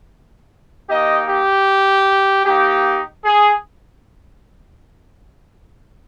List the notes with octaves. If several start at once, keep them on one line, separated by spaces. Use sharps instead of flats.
A#3 D#4 G4 D#5
G4
A#3 D#4 G4
G#4